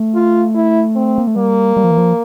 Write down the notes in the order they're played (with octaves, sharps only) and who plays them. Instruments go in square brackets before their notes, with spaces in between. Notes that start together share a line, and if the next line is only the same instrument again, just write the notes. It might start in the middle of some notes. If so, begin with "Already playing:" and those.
Already playing: [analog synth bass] A3
[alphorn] F4
E4
C4
[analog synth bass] A#3
A3
[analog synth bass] G3 [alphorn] A#3
[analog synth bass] G3
F3
E3
F3